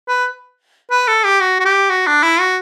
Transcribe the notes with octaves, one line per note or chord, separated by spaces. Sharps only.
B4
B4
A4
G4
F#4
F#4
G4
F#4
D4
E4
F#4